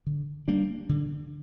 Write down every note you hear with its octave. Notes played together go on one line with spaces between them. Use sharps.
D3
G3 A#3 D4
D3